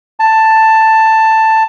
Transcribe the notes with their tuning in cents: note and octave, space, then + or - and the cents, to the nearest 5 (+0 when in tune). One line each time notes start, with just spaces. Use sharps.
A5 +10